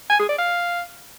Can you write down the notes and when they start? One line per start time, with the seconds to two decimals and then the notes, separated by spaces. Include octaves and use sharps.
0.10 G#5
0.19 G#4
0.29 D5
0.39 F5